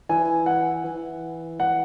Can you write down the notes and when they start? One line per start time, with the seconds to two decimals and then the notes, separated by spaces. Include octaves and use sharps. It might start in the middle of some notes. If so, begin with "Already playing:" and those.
0.09 E3 G#5
0.46 F#5
0.84 E3
1.60 F#5